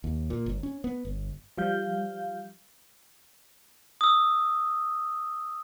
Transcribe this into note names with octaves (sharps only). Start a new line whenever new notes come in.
D#2
A#2
G1
C#4
B3
G1
F3 G3 F5 G6
D#6 E6